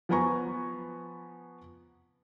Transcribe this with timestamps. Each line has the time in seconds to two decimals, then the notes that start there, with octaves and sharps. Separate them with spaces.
0.09 F3 B3 B4 G#5 A#5 C#6